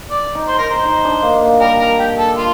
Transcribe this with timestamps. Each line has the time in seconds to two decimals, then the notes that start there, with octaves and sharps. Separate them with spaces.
0.10 D5
0.35 D#4
0.48 C5
0.58 D#4 A#4
0.69 C5
0.85 D#4
1.05 D4
1.23 A#3
1.42 A#3
1.60 G3 A#4
1.79 A#4
1.98 G4
2.17 A4
2.36 F4